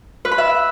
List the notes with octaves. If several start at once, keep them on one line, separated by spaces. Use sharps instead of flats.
B4
B5
E5